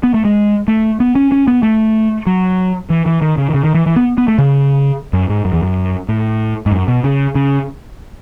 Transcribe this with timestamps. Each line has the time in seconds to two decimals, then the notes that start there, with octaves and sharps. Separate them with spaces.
0.03 B3
0.14 A3
0.25 G#3
0.68 A3
1.00 B3
1.15 C#4
1.32 C#4
1.48 B3
1.63 A3
2.27 F#3
2.90 E3
3.06 E3
3.22 D#3
3.38 C#3
3.50 D#3
3.54 C#3
3.64 D#3
3.75 E3
3.86 E3
3.96 B3
4.18 B3
4.28 A3
4.38 C#3
5.13 F#2
5.29 G#2
5.45 F#2
5.53 E2
5.63 F#2
6.09 A2
6.66 G#2
6.72 F#2
6.88 B2
7.04 C#3
7.35 C#3